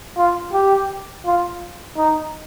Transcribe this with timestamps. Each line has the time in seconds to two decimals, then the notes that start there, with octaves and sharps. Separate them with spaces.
0.17 F4
0.53 G4
1.25 F4
1.98 D#4